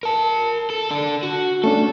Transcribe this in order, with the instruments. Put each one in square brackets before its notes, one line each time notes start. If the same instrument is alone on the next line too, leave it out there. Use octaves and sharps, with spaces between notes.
[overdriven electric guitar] A#4 A5
A4
D4 A4
F#4
[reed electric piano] A3 C#4 D4 [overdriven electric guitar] A4